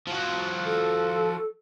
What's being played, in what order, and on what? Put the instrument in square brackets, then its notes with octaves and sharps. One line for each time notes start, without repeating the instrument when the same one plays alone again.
[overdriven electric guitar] F3 F#4
[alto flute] A4